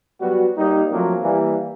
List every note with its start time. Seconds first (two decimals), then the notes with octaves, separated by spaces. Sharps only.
0.21 F#3 G3 B3 F#4
0.58 G3 A#3 D#4
0.92 F3 F#3 A3 A#3 C4
1.22 E3 G3 A#3